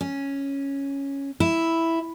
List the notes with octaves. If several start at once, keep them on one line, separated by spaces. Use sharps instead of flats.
C#4
E4